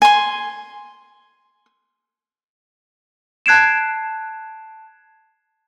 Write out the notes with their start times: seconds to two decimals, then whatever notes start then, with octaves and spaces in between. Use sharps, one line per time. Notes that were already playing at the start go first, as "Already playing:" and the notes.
0.02 G#5 C6
3.46 A5 F#6 G#6 C7 D7 E7